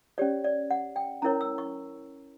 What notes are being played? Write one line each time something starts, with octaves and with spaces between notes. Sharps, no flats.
C#4 G4 C#5 D5
D5
F#5
G5
C#4 E4 A#4 C#5 A#5
E6
C#6